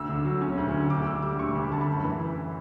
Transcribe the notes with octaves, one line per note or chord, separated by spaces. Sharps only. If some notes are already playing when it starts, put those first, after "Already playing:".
Already playing: D2 E6
D3
F#3
C#4
D2
D3
D2 D6
D3 E6
G3 D6
D2 C#6
D2
B5
D3 A5
B5
F#2
E3